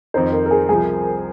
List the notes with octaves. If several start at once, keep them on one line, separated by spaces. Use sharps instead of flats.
F2 D#3 C4 D#4 C5
A#4
A#4
G#4
C2 C3 F3 G#4